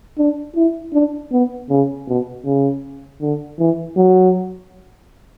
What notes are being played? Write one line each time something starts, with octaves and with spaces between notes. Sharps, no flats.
D4
E4
D4
B3
C#3
B2
C#3
D3
E3
F#3